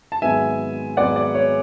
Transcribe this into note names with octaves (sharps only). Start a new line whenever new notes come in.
A5
G#1 G#2 F#3 B3 E5 G#5
G#1 G#2 F#3 B3 D5 F#5
D5
C#5